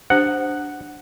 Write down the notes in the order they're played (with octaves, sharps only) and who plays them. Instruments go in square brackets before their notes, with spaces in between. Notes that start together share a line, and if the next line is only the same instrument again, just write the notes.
[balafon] D4 G4 C5 [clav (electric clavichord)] F#5